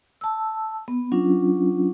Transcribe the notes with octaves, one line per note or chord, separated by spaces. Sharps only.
A5 E6
B3
F#3 C#4 D4 F4